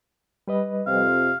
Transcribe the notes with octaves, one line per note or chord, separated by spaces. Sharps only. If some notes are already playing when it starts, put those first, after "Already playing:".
G3 B4 D#5
F2 C3 C4 F5